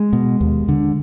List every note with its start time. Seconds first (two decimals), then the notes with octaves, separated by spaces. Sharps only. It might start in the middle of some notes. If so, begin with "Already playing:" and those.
Already playing: G#3
0.13 B2
0.41 D#2
0.69 D3